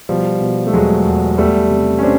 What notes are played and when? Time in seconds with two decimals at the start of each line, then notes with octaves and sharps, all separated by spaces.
0.09 B2 F3 G3
0.41 B2
0.67 A3
0.73 E2 F#3 G#3
1.05 E2
1.38 E2 G3 A3
1.70 C3
1.99 C#4
2.03 C4 D4